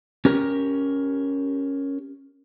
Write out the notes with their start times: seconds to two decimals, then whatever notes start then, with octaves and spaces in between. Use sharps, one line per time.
0.25 C#4 G4 A#4